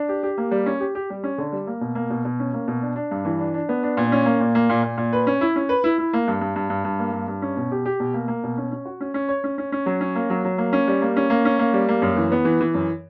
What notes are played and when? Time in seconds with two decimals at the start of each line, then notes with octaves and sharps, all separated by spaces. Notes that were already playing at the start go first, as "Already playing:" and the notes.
Already playing: D4
0.09 G4
0.23 G4
0.38 A#3
0.51 G3
0.66 C#4
0.80 G4
0.95 G4
1.10 G3
1.24 C#4
1.38 D3
1.52 G3
1.67 A#3
1.81 B2
1.95 A#3
2.10 B2
2.25 B2
2.40 C#4
2.54 A#3
2.68 B2
2.81 D4
2.96 D4
3.11 G2
3.25 E3
3.39 D4
3.54 D4
3.69 B3
3.83 D4
3.97 A#2
4.12 C#4
4.26 A#3
4.40 A#2
4.55 A#3
4.70 A#2
4.83 A#2
4.98 A#2
5.13 B4
5.27 C#4
5.41 E4
5.56 C#4
5.69 B4
5.84 E4
5.98 E4
6.13 A#3
6.28 G2
6.41 G2
6.56 G2
6.70 G2
6.84 G2
6.99 A#3
7.13 G2
7.28 G2
7.42 C#4
7.57 B2
7.72 G4
7.86 G4
8.00 B2
8.14 A#3
8.28 A#3
8.44 B2
8.57 C#4
8.71 C#4
8.85 F#4
9.00 C#4
9.14 C#4
9.29 C#5
9.44 C#4
9.58 C#4
9.72 C#4
9.86 F#3
10.01 C#4
10.15 A#3
10.30 F#3
10.44 F#3
10.58 A#3
10.73 C#4
10.88 G3
11.02 A#3
11.16 C#4
11.30 A#3
11.45 C#4
11.59 A#3
11.73 G3
11.89 A#3
12.02 F#2
12.16 E3
12.32 B3
12.45 E3
12.61 E3
12.74 F#2